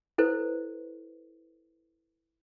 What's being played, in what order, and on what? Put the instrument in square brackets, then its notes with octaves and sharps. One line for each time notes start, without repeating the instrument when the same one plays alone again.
[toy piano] E4 A4 B4 C5